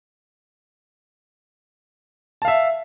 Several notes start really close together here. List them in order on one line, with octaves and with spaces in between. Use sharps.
A5 F5 E5